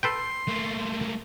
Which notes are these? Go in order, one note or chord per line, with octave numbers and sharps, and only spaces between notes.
A4 B4 G5 C6
A3 A#3